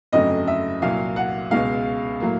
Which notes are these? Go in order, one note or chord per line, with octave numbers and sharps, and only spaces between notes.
G1 F2 C#3 F#3 A3 D#5
E5
C2 A#2 F#3 F5
F#5
C#2 B2 G#3 F5
A2 F#3 A#3